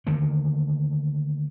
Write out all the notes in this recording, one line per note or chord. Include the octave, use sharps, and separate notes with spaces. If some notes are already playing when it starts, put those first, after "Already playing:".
D3 D#3 A3 A#3